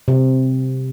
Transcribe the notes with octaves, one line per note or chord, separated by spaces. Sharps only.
C3